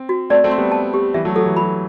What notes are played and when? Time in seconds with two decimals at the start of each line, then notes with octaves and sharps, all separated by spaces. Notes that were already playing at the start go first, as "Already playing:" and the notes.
Already playing: C4
0.09 F#4
0.30 A3 C4 D5
0.44 A3 C4
0.51 C6
0.58 G3 B3
0.72 A5
0.94 G4
1.14 E3 G3 E5
1.25 F#3 A3
1.36 F#3 A4
1.46 E3
1.56 F#3 B5